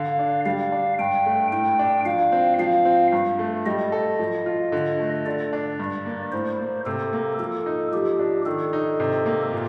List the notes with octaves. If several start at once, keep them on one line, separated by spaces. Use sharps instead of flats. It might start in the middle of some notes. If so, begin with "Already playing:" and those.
Already playing: D3 F5
D4
G3 F5
D4
G2 G5
A3
A2 G5
D4
F3 F5
C4
F3 F5
C4
G2
A3
G3 D#5
A4
F3
F4
D3
A3
D3 D5
D4
G2
A#3
A2 C5
A#3
C3 A4
A#3
F3 A4
D#4
F3 G4
D4
D#3 A4
D#4
C3
A#3
A#2